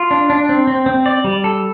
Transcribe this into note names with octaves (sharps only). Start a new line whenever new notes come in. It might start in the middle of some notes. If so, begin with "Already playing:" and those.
Already playing: F4
D4
D4
C4
C4
C4
D5
G3
A4